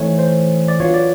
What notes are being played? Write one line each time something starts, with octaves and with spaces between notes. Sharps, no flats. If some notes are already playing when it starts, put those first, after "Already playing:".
Already playing: E3 A3 C4 D#4 C5 C#5
C5
D5
F#3 B3 D4 F4 C#5
D5